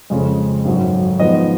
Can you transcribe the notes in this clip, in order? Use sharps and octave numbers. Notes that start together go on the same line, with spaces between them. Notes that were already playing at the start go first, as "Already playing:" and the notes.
F2 C#3 G#3
G#1 F#2 D#3 F#3
G#2 F3 B3 D#5